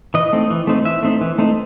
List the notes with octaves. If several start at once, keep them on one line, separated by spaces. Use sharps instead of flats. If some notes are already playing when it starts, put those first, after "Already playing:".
E3 D#5
A3 C4 D#4
E3
A3 C4 D#4
E3 E5
A3 C4 D#4
E3
A3 C4 D#4